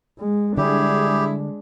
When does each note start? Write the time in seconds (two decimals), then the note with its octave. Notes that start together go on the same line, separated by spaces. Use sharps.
0.19 G#3
0.57 D3 G3 G#3 D4 E4 G4 G#4